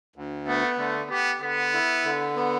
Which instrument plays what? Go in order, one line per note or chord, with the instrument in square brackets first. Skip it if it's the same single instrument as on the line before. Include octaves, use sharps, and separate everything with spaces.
[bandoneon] D2
[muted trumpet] A3 [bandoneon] B3
[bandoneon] D3 [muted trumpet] A3
[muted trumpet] B3 [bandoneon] G4
[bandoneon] D3 [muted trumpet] B3
[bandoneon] E4
D3
B3